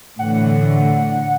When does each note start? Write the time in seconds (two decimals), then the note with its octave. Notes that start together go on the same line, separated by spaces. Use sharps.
0.19 A2 D3 E3 F#5